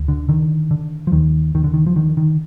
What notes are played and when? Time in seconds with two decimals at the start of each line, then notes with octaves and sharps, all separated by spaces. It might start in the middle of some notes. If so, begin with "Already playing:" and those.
Already playing: D2
0.08 D3
0.29 D3 D#3
0.71 D3
1.07 F3
1.12 D#2 D#3
1.55 D#2 D#3
1.64 D3
1.74 D#3
1.87 F3
1.96 D3 D#3
2.17 D#3